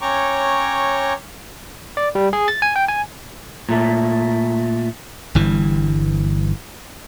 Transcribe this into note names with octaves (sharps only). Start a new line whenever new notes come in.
C#4 C#5 G5 A#5 C#6 D6
D5
G3
G#4
A6
G#5
G5
G#5
A#2 A3
G1 G2 E3